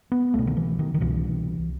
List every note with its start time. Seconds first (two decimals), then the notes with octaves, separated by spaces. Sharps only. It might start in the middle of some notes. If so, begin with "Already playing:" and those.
0.12 B3
0.34 C2 B2 A3
0.47 D#3
0.57 E3
0.79 D#3
0.94 D#3
1.01 C2 B2 E3